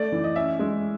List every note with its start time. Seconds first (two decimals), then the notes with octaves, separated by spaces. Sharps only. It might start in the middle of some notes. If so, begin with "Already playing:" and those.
Already playing: A3 D5
0.12 E3
0.24 D#5
0.36 C#4 E5
0.59 G#3